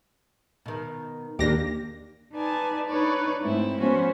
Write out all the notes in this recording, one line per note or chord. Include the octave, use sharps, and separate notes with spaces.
B2 D#3
D#2 A#3 D4 G4 A#6
D#4 B4 D5 G#5 A5
D4 D#4 B4 C#5 D5
G#2 A3 C4 E4
F3 B3 C#4 F#4 C5